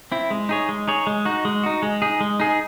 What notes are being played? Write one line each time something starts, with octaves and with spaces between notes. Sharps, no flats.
C4 E4
G#3
D#4 G#4 C#5
G#3
D#4 G#4 C#5
G#3
D#4 F#4
G#3
D#4 F#4
G#3
D#4 G#4
G#3
D#4 G#4